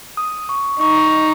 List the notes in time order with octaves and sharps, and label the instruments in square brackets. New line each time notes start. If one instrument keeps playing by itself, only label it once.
[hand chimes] D#6
C#6
[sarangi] D#4 [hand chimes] C#6